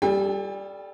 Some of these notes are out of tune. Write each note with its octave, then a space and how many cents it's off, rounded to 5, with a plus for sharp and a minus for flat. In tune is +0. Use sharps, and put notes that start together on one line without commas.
G3 +0 A4 -20 G5 +45